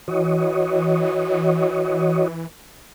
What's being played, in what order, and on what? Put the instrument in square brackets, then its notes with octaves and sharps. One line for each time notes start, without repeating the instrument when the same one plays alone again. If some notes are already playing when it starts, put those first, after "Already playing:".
[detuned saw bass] E3 [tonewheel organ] F#4 C#5 D#5